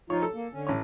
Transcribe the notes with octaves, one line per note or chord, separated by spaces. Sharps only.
F3 D#4 F4 C#5
A4
A#3
D3 C#4
A1 C#5